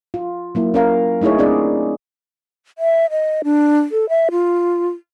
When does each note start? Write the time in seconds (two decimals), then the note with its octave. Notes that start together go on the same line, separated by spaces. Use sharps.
0.14 F4
0.55 F#3 A#3 E4
0.74 C#4 A#4 F5
1.21 A3 D#4 E4 G#4 C#5
1.38 C4 D4 G#4 D5
2.78 E5
3.10 D#5
3.44 D4
3.92 A4
4.09 E5
4.31 F4